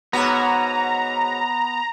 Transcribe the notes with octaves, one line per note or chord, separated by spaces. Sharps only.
G#2 B3 F#4 C#5 A#5